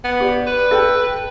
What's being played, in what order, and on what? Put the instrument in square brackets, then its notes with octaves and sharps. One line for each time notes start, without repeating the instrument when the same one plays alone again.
[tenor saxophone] B3
[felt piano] G4 D5
[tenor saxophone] B4
[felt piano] A4 G5